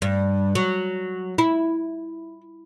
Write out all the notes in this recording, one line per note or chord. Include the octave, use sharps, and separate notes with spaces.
G2
F#3
E4